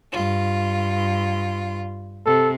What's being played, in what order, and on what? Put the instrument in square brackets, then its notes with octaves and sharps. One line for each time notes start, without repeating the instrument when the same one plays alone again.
[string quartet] G2 F4
[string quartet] C3 [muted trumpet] A4